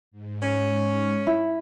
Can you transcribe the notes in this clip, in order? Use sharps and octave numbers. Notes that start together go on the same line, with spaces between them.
G#2
C#4
E4